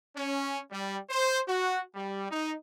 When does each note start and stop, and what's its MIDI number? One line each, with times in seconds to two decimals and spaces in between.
0.16 0.60 61
0.72 0.99 55
1.09 1.40 72
1.48 1.81 66
1.95 2.27 55
2.30 2.53 63